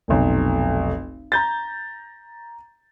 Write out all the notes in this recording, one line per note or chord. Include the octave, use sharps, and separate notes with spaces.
F1 B1
A#5 G6 A6